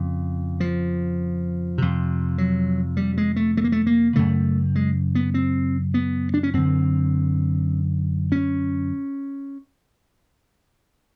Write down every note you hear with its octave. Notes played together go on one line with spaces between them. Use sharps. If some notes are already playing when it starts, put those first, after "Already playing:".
Already playing: F2 C#3
F3
F2 C3
F#3
G3
G#3
A3
A3
A#3
A3
A#3
F#2 C#3 A3
G#3
B3
C4
B3
D4
C#4
F#2 D3 C4
C#4